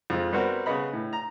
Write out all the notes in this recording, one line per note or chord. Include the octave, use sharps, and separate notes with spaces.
F2 G#3 F4
G3 B3 C4 F#4 A#4
C#3 B3 D#5 B5
A2
A#5